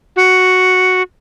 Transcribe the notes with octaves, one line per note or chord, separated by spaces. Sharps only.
F#4